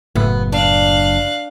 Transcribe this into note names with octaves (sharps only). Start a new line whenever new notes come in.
F#1 A2 B3
D4 F5 F#6